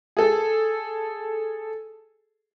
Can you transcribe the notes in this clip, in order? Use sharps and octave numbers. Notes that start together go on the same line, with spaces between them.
G#4 A4